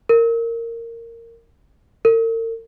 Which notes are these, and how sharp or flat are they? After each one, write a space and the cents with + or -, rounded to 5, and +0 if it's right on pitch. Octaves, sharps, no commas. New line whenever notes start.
A#4 -15
A#4 -45